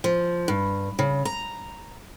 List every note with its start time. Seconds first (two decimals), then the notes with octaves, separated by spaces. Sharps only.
0.04 F3
0.48 G2
0.99 C#3
1.25 A#5